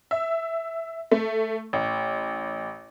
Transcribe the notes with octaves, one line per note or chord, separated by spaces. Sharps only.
E5
A3
A1